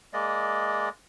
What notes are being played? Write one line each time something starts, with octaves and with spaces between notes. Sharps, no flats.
G#3 A#3 D5 D#5